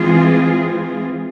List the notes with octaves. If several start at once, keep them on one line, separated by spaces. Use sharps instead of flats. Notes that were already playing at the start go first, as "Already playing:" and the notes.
Already playing: E3 G#3 C4 F4 G#4